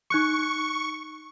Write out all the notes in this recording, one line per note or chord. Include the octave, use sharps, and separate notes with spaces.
D#4 C#6 F#6 C#7